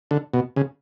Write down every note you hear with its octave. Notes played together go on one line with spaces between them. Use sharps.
D3
B2
C#3